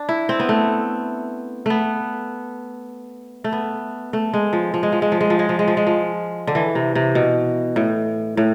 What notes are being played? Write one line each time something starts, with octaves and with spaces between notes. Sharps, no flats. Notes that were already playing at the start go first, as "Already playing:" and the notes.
Already playing: D4
E4
C4
B3
A3
A3 B3
A3
B3
A3
G#3
F3
F3
G#3
F3
G#3
F3
G#3
F3
G#3
F3
G#3
F3
G#3
F3
D3
E3
C3
C3
B2
A2
A2